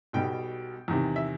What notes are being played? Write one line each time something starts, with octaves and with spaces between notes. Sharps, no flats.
B1 B2 G3 G5
E2 C3 D#3
E5